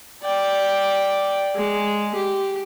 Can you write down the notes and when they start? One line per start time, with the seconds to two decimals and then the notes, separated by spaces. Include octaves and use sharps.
0.23 D5 G5
1.55 G#3
2.14 G4